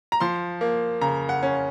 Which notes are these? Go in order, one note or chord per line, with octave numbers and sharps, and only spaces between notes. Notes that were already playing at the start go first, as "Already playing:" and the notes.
A#5
F3 C6
A#3
C#3 A#5
F#5
C#4